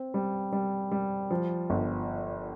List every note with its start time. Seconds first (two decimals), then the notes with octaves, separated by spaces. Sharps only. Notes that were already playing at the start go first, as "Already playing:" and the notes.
Already playing: C4
0.14 G3
0.52 G3
0.92 G3
1.31 F3
1.70 G1